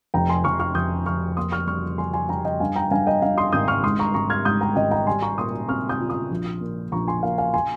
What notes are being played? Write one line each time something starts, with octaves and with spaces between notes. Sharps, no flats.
F1 G5 A#5
G#5 C6
F1 C#6 F6
C#6 F6
F1 D#6 G6
F1 C#6 F6
A#3 C6 D#6
C#6 F6
G3 C#6 F6
G3 G#5 C6
G#5 C6
G3 G5 A#5
D#5 G5
G2 F5 G#5
G5 A#5
G2 F5 G#5
D#5 G5
G2 F5
C6 D#6
G#1 D#6 G6
C#6 F6
G#2 C6 D#6
A#5 C#6
G#1 A#5 C#6
F6 G#6
G#2 D#6 G6
G5 A#5
G#1 D#5 G5
G5 A#5
G3 G#5 C6
A#5 C#6
A#2 C6 D#6
C4 C#6 F6
D#6 G6
F4
C6 D#6
A#1
A#2
A#1 A#5 C#6
G#5 C6
A#2 F5
F5 G#5
G#5 C6